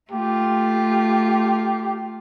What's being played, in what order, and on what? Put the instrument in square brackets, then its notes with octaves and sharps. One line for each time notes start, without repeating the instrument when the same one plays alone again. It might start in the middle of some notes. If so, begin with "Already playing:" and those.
[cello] A3 F4 [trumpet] G4